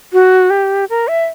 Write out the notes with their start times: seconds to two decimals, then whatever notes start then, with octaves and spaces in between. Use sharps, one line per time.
0.13 F#4
0.50 G4
0.89 A#4
1.08 E5